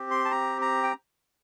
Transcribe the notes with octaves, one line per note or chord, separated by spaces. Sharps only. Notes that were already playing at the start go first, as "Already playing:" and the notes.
Already playing: C4 G4
C6
A5
A#5
A#5
G5